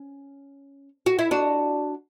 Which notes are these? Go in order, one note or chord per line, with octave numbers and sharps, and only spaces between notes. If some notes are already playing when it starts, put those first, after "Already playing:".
Already playing: C#4
F#4
E4
D4 F#4